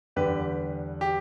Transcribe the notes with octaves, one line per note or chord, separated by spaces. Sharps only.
E2 D3 G3 G4 B4
G4